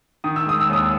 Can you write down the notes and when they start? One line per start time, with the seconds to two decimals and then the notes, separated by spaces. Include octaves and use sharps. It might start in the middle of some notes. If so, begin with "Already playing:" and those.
0.24 D#3 D#6
0.36 E6
0.46 G#3 D#6
0.61 E6
0.69 D#2 D#6